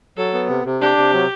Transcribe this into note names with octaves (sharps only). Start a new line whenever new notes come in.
F#3 A4
B3
C3
C3
D4 G4
C3
F#3